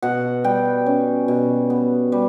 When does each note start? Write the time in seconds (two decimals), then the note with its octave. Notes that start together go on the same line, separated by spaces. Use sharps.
0.02 B2 F#5
0.44 G3 G5
0.86 C#4
1.28 B2
1.70 B3
2.12 G3